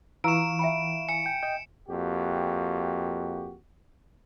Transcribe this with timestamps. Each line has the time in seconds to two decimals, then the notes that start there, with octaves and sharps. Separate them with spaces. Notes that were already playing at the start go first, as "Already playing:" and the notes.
0.24 E3 F4 F5 A#5 C#6 E6 D7 E7
0.59 E5 G5 B5
1.09 G#5 C#7
1.26 G5
1.43 D#5 G5
1.89 F2 A#3 F#4 G4